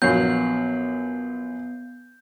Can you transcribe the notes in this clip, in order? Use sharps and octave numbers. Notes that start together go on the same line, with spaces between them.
A#1 F#3 B3 G6 C7